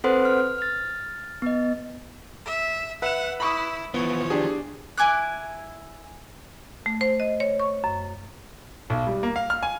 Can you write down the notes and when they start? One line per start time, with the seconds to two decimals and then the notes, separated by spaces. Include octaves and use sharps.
0.04 C4 A4 B4 C5 F#5 C6
0.25 F6
0.58 F6 A6
1.42 B3 D#5
2.45 E5
3.02 B4 E5 F#5 E7
3.40 E4 B5 C#6 D#6
3.94 E3 F3 B3 C#5
4.30 D4 G4 G#4
4.98 E4 G#5 D6 F#6
6.86 A3
7.01 C5
7.20 D#5
7.40 C#5
7.60 C#6
7.84 F#2
8.90 B1
9.07 G3
9.23 A#3
9.36 F5
9.50 F6
9.63 G#5